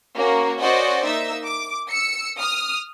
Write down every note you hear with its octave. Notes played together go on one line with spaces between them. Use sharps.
A#3 C#4 F#4
C#4 F#4 C5 D5 D#5 F#5
A#3 D#4 E5 E6
D6
E6 C#7
D#6 F6